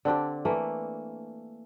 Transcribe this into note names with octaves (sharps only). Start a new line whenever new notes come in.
D3 C4 D4 G4
E3 A3 A#3